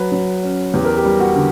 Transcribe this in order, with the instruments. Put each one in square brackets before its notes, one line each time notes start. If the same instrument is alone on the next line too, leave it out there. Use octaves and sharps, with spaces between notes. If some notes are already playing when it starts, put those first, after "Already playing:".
Already playing: [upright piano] F#3 B4
F#3
C#4
E2 G4
A#4
G4
G3
F#4
D3